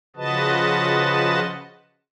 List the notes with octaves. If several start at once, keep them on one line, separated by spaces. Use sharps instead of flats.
C#3 F3 F#4 B4 D#5 A5